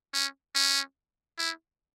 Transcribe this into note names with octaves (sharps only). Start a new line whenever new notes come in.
C#4
C#4
E4